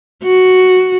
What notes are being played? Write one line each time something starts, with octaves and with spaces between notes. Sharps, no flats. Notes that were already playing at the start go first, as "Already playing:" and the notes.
F#4